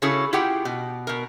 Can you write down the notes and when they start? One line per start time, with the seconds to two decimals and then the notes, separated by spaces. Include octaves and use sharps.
0.02 C#3 C#4 E4 F#4 G#4 A4
0.33 E4 F4 G4 G#4 F#5 G5
0.65 B2
1.07 B2 A#4